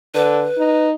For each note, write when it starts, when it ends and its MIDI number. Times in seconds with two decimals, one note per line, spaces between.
0.14 0.47 50
0.14 0.87 71
0.58 0.93 63